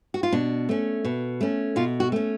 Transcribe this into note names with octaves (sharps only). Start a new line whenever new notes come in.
F#4
F4
B2 D4
A3 C#4
B2
A3 C#4
B2 F4
F#4
A3 C#4